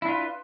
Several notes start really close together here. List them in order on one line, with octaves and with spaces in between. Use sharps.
E4 D4 F4 B4